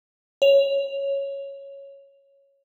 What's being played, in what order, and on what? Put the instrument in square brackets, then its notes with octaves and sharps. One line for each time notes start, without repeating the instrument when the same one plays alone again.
[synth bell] C#5 F7